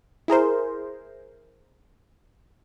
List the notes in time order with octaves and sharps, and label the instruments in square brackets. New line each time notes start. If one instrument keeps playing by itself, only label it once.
[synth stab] E4 G#4 A#4 C5